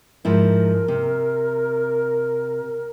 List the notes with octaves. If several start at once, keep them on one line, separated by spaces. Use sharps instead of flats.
G#2 F3 E4 A#4
C3